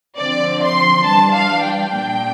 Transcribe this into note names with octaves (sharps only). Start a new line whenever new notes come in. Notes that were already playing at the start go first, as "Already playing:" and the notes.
D3 F3 C4 D5
C6
E3 G3 D4 A5
F5
G5
A#2 G3 A#3 D4